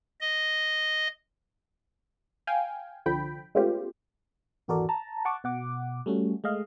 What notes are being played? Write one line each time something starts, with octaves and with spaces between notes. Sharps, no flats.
D#5
F5 G5 G#5
C2 D3 F3 G5 B5
G#3 A3 B3 C#4 F4 G4
G#1 E2 F#4 A4 A#4 D5
A5 A#5
F#5 A5 C#6 D6
B2 F#5 D6
G3 A3 C#4 F#4
G#3 A3 D#5 F5